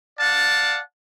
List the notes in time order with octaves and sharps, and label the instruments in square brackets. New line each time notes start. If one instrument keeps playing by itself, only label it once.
[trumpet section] D5 F5 F#5 A5